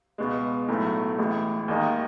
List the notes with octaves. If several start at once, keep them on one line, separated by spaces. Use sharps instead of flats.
C#2 B2 G#3
B1 A2 F#3 A3
A1 A2 G#3
D#2 D#3 G#3 D#4